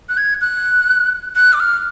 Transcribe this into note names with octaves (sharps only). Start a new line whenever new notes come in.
F#6
G#6
F#6
F#6
D6
F6